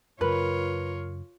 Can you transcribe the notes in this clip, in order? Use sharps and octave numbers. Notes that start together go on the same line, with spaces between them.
F#2 C#3 F4 A#4 B4 C#5